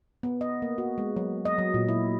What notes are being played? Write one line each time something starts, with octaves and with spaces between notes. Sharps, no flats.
B3
D#5
A#3
F#4
G#3
F#3
D#5
F#3
A#2
E4